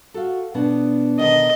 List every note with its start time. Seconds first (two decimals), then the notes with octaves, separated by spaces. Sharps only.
0.14 F#4 A4 F5
0.54 B2 B3 D4
1.19 B2 D3 D#3 D#5